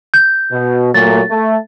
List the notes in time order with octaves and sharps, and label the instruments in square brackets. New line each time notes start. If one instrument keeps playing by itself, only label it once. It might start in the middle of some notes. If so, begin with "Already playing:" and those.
[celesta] G6
[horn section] B2
[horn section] A#2 F#3 A3 [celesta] A6
[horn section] A3